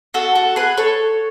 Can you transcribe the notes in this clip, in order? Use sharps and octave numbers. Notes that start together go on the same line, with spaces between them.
F#4 A4
F#4 A4
G#4 B4
A4 C#5